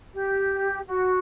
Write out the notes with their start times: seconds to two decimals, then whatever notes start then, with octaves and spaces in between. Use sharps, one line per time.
0.14 G4
0.88 F#4